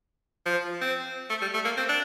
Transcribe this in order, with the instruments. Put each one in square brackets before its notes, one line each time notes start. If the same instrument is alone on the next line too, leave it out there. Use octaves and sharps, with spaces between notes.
[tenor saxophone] F3
C4
A3
G3
A3
A#3
C4
D4